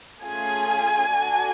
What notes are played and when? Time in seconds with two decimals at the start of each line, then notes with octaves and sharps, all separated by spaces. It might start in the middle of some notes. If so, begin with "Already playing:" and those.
0.21 A3 C#4 F4 G#4 G#5
1.10 D4 F#4 A4